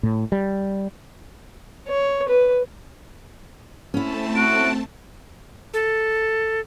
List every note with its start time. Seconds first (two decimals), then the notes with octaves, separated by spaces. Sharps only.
0.03 A2
0.32 G3
1.88 C#5
2.28 B4
3.94 A3 C4 C#4 E4 A5
4.36 F#4 D7
5.74 A4